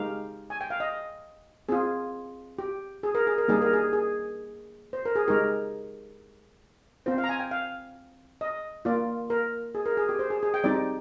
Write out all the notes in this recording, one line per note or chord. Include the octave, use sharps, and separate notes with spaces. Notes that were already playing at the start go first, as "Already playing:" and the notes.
Already playing: G#3 D#4 G4 F5
G#5
G5
F5
D#5
C4 F4 G#4
G4
G#4
A#4
G#4
A#4
G3 A#3 D#4 G4 G#4
A#4
G#4
G#4
C5
A#4
G#4
G#3 D#4 G4 A#4
C4 F4 C5
F5
A#5
G#5
G5
F5
D#5
A#3 F4 D5
A#4
G#4
A#4
G#4
G4
C5
G#4
G#4
G5
G3 C4 D#4 G4 D5